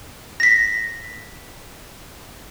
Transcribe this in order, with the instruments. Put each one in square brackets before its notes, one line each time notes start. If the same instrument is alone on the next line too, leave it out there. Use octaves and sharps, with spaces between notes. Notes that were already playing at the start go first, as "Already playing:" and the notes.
[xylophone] A#6 B6